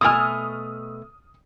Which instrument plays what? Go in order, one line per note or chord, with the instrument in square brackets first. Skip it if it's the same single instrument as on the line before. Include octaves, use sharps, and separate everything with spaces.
[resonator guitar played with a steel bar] B2 A3 G#5 [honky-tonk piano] D#6 F6